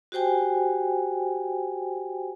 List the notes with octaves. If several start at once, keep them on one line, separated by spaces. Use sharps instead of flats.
F#4 G4 C5 G5 G#5